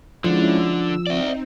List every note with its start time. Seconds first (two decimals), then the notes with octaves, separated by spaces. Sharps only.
0.24 D3 F3 G#3 C#4 D4 E4
0.60 E6
1.07 C4 D#4 D5 E5